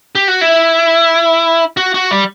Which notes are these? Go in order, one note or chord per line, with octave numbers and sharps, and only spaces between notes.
G4
F#4
E4
F#4
F#4
G3